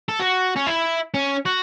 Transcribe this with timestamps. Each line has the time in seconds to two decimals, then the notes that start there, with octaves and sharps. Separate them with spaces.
0.08 A4
0.20 F#4
0.56 C#4
0.67 E4
1.14 C#4
1.45 F#4